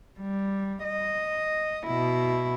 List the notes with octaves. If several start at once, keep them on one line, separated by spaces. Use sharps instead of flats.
G3
D#5
B2 E4